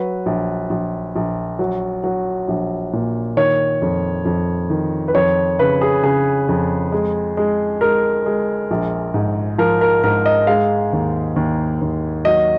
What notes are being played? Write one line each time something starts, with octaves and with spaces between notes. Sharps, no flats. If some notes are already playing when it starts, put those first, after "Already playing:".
Already playing: F#3 B4
A#1
A#1
A#1
F#3
F#3
A#1
A#2
D#3 C#5
F2
F2
D#3
B4
F2 C#5
C#3 B4
G#4
C#3 G#4
F2
G#3
G#3
G#3 A#4
G#3
A#1
G#2
F3 A#4
A#4
G#2 A#4
D#5
G#3 F5
D#2
D#2
D#2
F#3 D#5